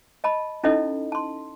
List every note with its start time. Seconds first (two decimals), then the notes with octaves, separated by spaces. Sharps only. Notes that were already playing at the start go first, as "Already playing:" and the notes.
0.24 D#5 A5 B5
0.64 C#4 D#4 E4 A4 D#5
1.12 A5 C6